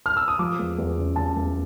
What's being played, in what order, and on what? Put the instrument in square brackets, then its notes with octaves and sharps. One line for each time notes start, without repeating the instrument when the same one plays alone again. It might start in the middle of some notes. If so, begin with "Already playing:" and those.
[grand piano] F6
E6
D#6
F3 D6
E2
E2
C#3
C#3 A5
E2